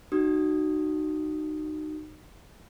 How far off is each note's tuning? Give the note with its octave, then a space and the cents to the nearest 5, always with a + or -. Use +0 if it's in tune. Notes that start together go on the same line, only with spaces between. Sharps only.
D#4 -25 F#4 +20 D#6 +0